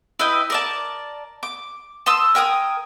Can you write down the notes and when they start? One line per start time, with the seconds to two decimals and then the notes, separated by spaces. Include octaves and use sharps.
0.19 E4 B4 D#5 G5
0.50 A#4 D5 A5
1.43 D6
2.06 A5 C6 D#6 E6
2.35 A#4 G5 G#5 D#6